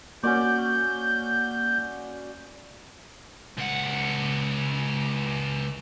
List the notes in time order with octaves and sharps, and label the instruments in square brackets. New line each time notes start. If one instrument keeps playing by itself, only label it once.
[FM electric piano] A#3 [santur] C#4 F#4 D5 [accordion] G6
[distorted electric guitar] C#2 F#5